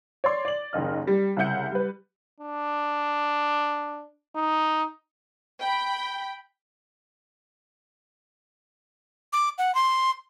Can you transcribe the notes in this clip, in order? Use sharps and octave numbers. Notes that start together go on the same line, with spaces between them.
C#5 D5 C6
D5 F#7
F#1 D#2 D#5 F6
G3
C2 C#3 E5 F#5 G6 C#7
G3 B4
D4
D#4
G5 B5
D6
F#5
C6